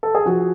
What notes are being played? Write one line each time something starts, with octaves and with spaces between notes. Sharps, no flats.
A4
G#4
F3 F#4